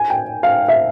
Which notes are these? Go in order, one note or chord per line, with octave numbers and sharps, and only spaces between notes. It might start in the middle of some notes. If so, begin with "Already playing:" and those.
Already playing: G#5
G5
F5
E5